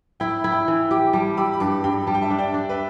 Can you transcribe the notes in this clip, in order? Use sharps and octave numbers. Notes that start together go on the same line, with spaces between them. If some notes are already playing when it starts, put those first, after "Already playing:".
E4 G5 B5
E4
G5 B5
E3
G4
G3 A5 D6
G4 B5 E6
B5
G2 A5 D6
G2 G5 B5
G3 A5
G5
E5 A5
D4
D5 G5
D4
B4 E5